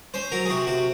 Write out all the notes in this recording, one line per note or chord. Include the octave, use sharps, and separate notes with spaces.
C#4 C5
F#3 A#4
G#4
C3 F#4
C3 F#4